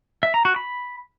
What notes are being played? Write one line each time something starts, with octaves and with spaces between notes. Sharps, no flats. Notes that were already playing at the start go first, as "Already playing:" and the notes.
E5
A#5
F#4
B5